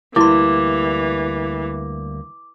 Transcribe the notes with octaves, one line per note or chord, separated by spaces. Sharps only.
D2 E3 G3 A#3 E4 C6 D6